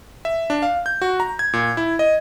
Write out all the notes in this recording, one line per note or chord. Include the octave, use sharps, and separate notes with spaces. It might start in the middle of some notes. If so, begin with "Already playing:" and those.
E5
D4
F5
G6
F#4
A#5
G#6
A#2
E4
D#5